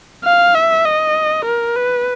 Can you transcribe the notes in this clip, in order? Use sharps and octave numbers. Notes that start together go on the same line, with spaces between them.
F5
E5
D#5
A#4
B4